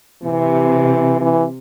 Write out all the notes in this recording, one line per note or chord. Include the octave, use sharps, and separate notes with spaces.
C3 E3
E3